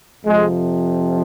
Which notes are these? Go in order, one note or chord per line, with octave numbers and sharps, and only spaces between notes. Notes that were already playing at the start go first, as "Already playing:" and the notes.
F2 C3 F3 G#3